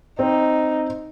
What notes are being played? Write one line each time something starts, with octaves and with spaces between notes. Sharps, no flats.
C4 D#4